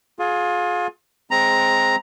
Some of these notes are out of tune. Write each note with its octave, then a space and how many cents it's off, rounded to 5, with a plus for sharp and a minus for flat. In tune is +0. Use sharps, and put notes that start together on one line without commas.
F4 +30 G#4 +25
G#3 +0 C4 +0 A#5 +5